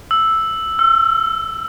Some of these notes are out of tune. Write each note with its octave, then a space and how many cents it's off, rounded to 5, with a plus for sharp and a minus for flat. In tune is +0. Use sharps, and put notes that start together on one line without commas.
E6 +0
E6 +40